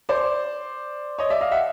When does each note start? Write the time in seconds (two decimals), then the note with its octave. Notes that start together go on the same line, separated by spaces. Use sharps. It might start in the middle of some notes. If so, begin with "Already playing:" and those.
0.09 C5 D5
1.18 C#5 D#5
1.30 D5 E5
1.41 D#5 F5
1.51 E5 F#5